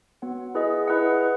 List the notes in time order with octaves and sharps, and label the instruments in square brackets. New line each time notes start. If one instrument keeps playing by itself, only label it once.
[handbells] B3 F#4 C#5 F#5
E4 G#4 B4 D#5 F#5
E4 G#4 B4 D#5 F#5
B4